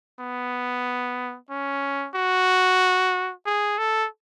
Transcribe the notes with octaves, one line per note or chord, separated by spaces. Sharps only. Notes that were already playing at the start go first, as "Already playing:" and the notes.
B3
C#4
F#4
G#4
A4